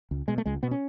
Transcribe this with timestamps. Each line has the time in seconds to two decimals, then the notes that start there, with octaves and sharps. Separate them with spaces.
0.11 C#2
0.28 B2 G#3
0.38 A3
0.46 C#2 G#3
0.63 B2 B3
0.71 C#4